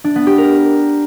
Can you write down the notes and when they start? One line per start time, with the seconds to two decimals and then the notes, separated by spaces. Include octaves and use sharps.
0.04 D4
0.16 B3
0.27 G4
0.38 A#4